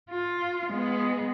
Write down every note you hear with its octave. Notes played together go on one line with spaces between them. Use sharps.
F4
G#3 B3